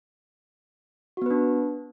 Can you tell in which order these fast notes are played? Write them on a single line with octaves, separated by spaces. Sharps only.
F#4 B3 B4 D4